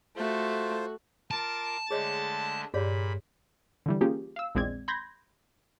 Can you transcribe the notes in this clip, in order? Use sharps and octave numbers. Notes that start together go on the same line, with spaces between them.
A3 F4 F#4 C5
F4 A#4 A5 D6
D3 G#3 A3 G#4 C#5 D#5
G2 A#2 G#4 C#5 D5 F5 B5
D3 E3 G3
A#3 C#4 F4 G4 G#4
F5 E6
A#1 E2 G#3 C4 D5 G#6
B5 C6 G6 G#6 A#6